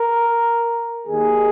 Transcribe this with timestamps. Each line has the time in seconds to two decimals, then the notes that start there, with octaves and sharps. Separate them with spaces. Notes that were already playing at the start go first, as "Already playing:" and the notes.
Already playing: A#4
1.07 D#2 D#3 A#3 G#4